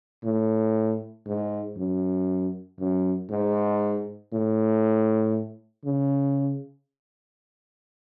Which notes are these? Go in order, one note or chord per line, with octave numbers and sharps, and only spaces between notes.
A2
G#2
F#2
F#2
G#2
A2
C#3